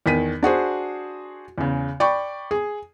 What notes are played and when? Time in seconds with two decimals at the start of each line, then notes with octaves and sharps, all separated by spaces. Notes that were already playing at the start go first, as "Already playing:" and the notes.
0.06 E2 D#3 B6 D#7
0.43 D4 F#4 G#4 C5
1.58 E2 C#3
2.00 D5 G5 B5 C#6
2.51 G#4